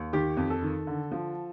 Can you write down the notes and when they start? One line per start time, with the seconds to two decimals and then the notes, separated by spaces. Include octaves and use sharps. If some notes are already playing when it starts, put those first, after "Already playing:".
Already playing: D#2
0.13 D#3 G4
0.37 F2
0.50 A4
0.63 D#3
0.87 D3
1.11 F3